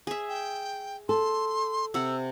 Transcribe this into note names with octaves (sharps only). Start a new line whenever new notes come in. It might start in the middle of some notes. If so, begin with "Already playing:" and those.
G#4 E5
G5
A4 C6
C3 F#5 E6